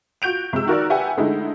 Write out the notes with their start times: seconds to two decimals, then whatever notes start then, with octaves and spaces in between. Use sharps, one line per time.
0.22 F4 F#4 G6 D7 F7
0.53 C3 G#3 E6
0.66 D#3 F#4 A#4 D5
0.90 G4 B4 E5 F#5 G#5
1.17 D3 G#3 A3 D#4 E4